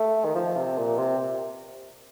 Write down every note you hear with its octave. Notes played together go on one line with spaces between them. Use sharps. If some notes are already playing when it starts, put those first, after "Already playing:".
Already playing: A3
D#3
F3
C3
A#2
C3